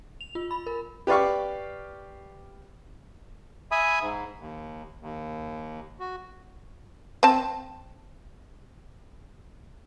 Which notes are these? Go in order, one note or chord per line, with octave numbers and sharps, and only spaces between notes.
F7
F4
B5
A#4
G4 B4 D5 F5 C#6
E5 G#5 B5 D#6
G#2
D#2
D#2
F#4
C4 A5